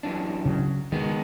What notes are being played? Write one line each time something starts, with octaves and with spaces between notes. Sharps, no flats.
F#2 E3 D4
C#3 F#3
D#3 G#3 B3